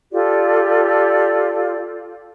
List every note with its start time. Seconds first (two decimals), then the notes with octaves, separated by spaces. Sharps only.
0.12 F4 G4 A4 D5